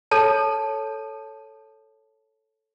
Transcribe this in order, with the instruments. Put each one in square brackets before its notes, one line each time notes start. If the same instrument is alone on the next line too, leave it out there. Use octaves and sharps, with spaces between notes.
[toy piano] A4 C#5 A5